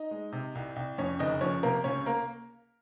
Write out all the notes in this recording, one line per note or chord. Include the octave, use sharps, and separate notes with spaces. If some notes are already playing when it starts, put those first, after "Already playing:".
Already playing: D#4 D#5
G#3
C3
C2
C2
F2 C#4 C#5
F#1 D#4 D#5
F3 C#4 C#5
C3 A#3 A#4
C#2 C#4 C#5
A#3 A#4